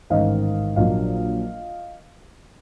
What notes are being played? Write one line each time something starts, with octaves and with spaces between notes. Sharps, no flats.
A1 G#2 D#3 D#5 F5
A#1 A#2 F#3 A#3 D4 D#5 F5